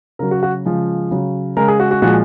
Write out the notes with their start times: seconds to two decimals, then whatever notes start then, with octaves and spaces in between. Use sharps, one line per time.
0.19 C#3 F#3 A#4
0.31 F#4
0.43 F#4
0.65 C#3 F3 G#3
1.11 C#3 F#3
1.57 C#3 G#3 A#4
1.68 G#4
1.80 F#4
1.91 F#4
2.02 A#2 F3 G#3 F#4